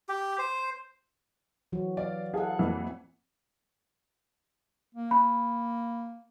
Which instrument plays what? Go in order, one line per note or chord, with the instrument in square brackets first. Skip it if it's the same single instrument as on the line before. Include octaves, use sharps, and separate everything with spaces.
[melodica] G4
C5
[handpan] E3 F#3 F#4
[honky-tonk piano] D5 [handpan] F5
[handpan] E4 F#5 [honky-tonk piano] G#4 A4 F5
[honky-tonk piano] F2 A#2 E3
[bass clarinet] A#3
[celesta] B5